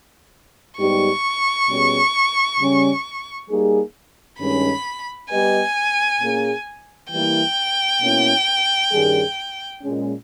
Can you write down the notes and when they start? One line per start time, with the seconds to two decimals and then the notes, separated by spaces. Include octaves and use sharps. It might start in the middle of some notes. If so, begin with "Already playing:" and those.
0.78 G#2 G3 B3 D#4 G4 C#6
1.69 B2 G3 C#4 G#4
2.59 C#3 G3 C#4
3.50 G3 A#3 D#4 G#4
4.39 G2 D#3 G#3 C#4 B5
5.30 G3 B3 G4 B4 D#5 G#5
6.21 A#2 A#3 C#4 G#4
7.11 E3 G3 A#3 E4 G5
8.01 B2 A#3 C#4 E4
8.91 G2 D#3 G3 C#4 G#4
9.82 A#2 G#3 C#4